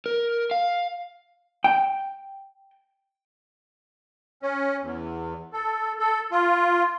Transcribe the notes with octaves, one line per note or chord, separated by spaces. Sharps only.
A#4
F5
G5
C#4
E2
A4
A4
F4